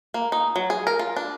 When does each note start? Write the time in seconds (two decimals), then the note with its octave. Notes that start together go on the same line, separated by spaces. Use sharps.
0.14 A#3
0.32 D#4
0.56 F#3
0.70 G#4
0.87 A#4
0.99 F4
1.17 D4